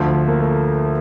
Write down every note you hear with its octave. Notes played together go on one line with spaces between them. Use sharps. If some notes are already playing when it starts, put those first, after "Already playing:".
Already playing: D2 D3 F3 A3
A#3
A3